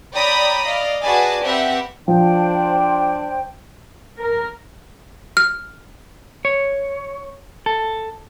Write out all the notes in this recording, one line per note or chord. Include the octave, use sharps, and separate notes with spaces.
C#5 D5 G5 A#5 B5 D#6
D5 D#5 F5
F#4 G#4 B4 D5 G#5 A5
C4 G4 B4 E5 F#5
F3 D4 C5 G5
A#4
F6
C#5
A4